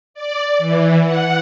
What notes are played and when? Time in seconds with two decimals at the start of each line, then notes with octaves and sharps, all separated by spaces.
0.14 D5
0.58 E3
1.03 F#5